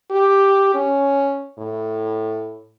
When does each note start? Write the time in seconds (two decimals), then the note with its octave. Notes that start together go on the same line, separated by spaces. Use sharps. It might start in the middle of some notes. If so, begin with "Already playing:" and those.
0.10 G4
0.74 C#4
1.58 A2